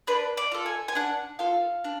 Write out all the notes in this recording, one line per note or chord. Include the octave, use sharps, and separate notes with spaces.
D4 B4
D5
F4 A4
G#5
G#5
D4 F#5
F4 A4 F5
D4